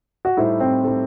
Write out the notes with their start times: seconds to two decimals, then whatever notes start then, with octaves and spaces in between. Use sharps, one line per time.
0.25 F#4
0.37 A2 G3 D#4 E4 A4 C5
0.60 C4
0.84 A2 G3 D#4 A4 C5